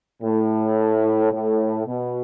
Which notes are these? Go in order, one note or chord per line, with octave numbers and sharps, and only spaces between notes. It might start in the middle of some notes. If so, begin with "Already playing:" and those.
A2
A2
B2